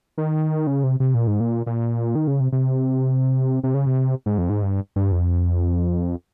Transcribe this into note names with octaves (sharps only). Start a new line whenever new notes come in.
D#3
C#3
C3
C3
A#2
G#2
A#2
A#2
D#3
C#3
C3
C3
C3
C#3
C3
G#2
F2
G#2
G2
G2
F2